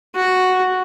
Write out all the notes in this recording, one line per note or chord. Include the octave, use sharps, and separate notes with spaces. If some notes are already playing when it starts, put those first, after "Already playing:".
F#4